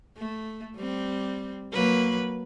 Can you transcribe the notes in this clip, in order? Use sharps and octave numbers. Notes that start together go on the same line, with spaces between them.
A3
G3 C4
F#3 A#3 B4